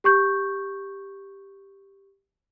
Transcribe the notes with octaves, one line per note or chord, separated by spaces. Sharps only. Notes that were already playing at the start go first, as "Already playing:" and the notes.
G4 C#6 G6